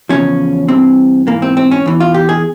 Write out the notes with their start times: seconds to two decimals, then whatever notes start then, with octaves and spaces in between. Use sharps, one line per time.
0.09 E2 C#3 F3 C#4
0.68 G2 E3 C4
1.27 G#2 E3 A#3
1.42 C4
1.57 C4
1.71 C#4
1.86 E2 E3
2.00 F4
2.14 G4
2.29 G#4